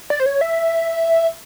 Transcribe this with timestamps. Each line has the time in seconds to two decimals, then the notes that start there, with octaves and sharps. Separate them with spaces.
0.10 D5
0.20 C5
0.26 C#5
0.41 E5